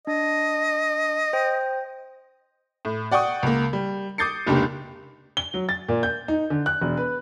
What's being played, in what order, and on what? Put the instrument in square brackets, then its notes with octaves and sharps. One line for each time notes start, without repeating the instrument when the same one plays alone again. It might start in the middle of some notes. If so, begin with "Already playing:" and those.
[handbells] D4 [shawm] D#5
[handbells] C5 G5
[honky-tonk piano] A2
D5 F#5 G5 C#6 D#6
C#2 A#3
G3
D6 D#6 G6 A6 C7 C#7
F1 C#2 A#3 D4 G4
[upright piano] G7
F#3
A6
A#2
G6
D#4
D3
F#6
E1
B4